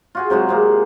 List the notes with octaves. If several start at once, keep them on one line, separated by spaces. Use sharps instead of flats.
F4 F#4 G#4
C3 F#3 G#3 F#4
C3 G#3 A#3